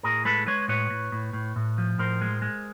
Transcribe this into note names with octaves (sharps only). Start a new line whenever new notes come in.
A2 G#4 A#4
G#3 A4 B4
G#3 B4 C#5
A2 B4 C#5
A2
A2
A2
A2
F3
A2 A#4 C5
G#3
G#3